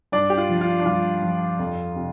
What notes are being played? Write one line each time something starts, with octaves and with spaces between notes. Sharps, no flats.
G2 D4 D5
G4
F4
F3
F4
D4
G2 F4
F3
F2
C3